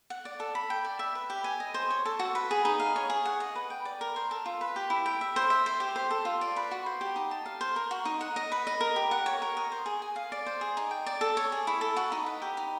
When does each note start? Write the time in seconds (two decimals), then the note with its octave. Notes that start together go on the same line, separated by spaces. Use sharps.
0.10 F#5
0.25 D5
0.40 A4
0.55 B5
0.70 G5
0.85 D5
0.99 E5
1.15 B4
1.30 G4
1.44 G#5
1.60 D#5
1.74 C5
1.90 C#5
2.06 A4
2.19 F#4
2.35 B4
2.51 G#4
2.65 D#4
2.80 F5
2.96 C#5
3.10 G#4
3.25 F#5
3.40 D#5
3.56 B4
3.70 G5
3.85 D5
4.01 A#4
4.16 C5
4.31 A4
4.46 F4
4.61 B4
4.76 G4
4.90 E4
5.06 G5
5.21 E5
5.36 C5
5.50 E5
5.66 C5
5.80 G4
5.96 C5
6.11 A4
6.25 F4
6.41 D5
6.56 B4
6.71 F#4
6.86 C5
7.01 G4
7.16 D#4
7.31 A5
7.46 F5
7.61 C5
7.76 A#4
7.91 F#4
8.05 D#4
8.21 F#5
8.36 D#5
8.52 B4
8.67 D#5
8.81 A#4
8.96 G4
9.11 F#5
9.26 C#5
9.42 A#4
9.57 D#5
9.72 C5
9.86 G#4
10.02 G#5
10.16 F5
10.32 D5
10.46 C5
10.61 G#4
10.77 D#4
10.91 G5
11.06 D5
11.21 A4
11.37 C#5
11.52 G#4
11.67 E4
11.81 A4
11.96 F#4
12.12 D#4
12.26 B4
12.42 G4
12.57 D#4